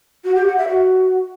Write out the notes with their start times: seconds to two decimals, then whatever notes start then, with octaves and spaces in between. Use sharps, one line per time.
0.24 F#4
0.35 G4
0.46 F#5
0.57 E5
0.69 F#4